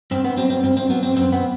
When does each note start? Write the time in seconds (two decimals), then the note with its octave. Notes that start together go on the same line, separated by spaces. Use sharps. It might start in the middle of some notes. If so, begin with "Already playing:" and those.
0.11 G2 C4
0.24 B3
0.37 F#3 C4
0.50 C4
0.63 G2 C4
0.77 C4
0.90 F#3 B3
1.03 C4
1.16 F#2 C4
1.33 B3